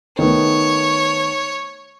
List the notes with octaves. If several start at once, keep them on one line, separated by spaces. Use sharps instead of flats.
D#3 A3 B3 C#5